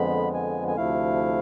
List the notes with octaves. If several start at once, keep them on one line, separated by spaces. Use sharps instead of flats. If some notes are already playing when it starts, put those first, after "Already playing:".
Already playing: F2 D3 F3 G#3 B3 B5
G#5
G#5
D2 C3 F3 A3 E4 F5